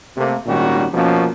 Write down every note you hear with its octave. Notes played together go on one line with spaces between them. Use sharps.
C3 A3 A#3
G#1 A#2 D#3 G3 C#4 F#4
B2 F3 A#3 B3 C#4